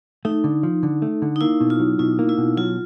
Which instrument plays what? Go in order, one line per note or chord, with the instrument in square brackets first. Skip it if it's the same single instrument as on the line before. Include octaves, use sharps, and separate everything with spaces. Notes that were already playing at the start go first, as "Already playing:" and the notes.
[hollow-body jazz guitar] A3 [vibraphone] D#4
[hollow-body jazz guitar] D3
F3
D3
A3
D3
[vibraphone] D#4
[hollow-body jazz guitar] A#3 [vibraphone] E4
[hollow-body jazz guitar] B2
[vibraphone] F4
[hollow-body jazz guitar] F#3
[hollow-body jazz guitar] B2 [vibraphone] E4
[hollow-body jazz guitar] A#3
[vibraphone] E4
[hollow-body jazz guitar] B2
[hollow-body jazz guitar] F#3 [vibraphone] F4